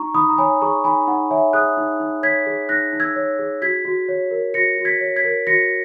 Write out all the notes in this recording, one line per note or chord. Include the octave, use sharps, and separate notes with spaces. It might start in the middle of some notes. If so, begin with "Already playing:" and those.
Already playing: D#4 A#5 C#6
D#4 B5 D#6
A#5
C#5 G#5 B5
G#4 A#5 C#6
D#4 G#5 B5
D#4 F#5
C#5 E5 G#5
G#4 D#6 F#6
D#4
D#4
C#5 G#6 B6
G#4
D#4 F#6 A#6
D#4
E6 G#6
C#5
G#4
F#4 G#6 B6
F#4
C#5
A#4
F#4 A#6 C#7
F#4
G#6 B6
C#5
G#6 B6
A#4
F#4 A#6 C#7